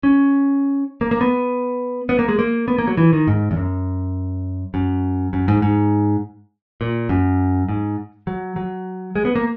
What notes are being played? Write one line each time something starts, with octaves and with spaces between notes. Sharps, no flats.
C#4
A#3
A#3
B3
B3
A#3
G#3
A#3
B3
A#3
F#3
E3
D#3
G#2
E2
F#2
F#2
F#2
G#2
G#2
A#2
F#2
G#2
F#3
F#3
G#3
B3
A#3